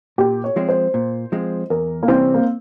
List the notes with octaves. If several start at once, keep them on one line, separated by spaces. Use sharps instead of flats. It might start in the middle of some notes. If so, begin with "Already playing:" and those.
A#2 G4
C#5
F3 G#3 C4
C5
A#2
F3 G#3 C4
E2 A#4
A#3
C3 E3 G3 C4 C#4
A#3